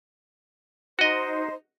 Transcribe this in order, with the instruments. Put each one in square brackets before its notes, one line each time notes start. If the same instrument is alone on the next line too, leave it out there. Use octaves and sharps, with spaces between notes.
[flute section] D#4 C5 [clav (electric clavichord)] F#4 D#5